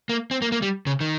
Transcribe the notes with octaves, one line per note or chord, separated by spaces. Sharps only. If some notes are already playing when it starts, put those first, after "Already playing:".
A#3
C4
A#3
A#3
G3
C#3
D#3